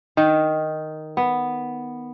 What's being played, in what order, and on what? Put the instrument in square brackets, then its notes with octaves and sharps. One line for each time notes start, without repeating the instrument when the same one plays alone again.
[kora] D#3
B3